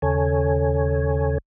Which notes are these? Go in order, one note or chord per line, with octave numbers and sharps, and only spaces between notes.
D#2 C#3 A4 C#5 G#5